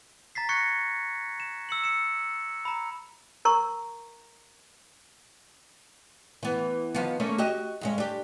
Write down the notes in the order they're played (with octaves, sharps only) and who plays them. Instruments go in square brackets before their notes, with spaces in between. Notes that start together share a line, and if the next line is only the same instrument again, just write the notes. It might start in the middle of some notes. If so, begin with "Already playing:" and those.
[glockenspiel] A#5 A6 B6 C7
C#6 F#6 G#6 A#6 C7 C#7
E7
E6 C#7 F#7
C#7 E7
A#5 B5
[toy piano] A#4 A#5 C#6
[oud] E3 B3
D#3 F3 B3
A3 A#3 C#4
F#4 G4 D#5
G2 G#3 C#4
D4 G4